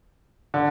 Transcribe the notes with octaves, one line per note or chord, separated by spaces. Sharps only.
D3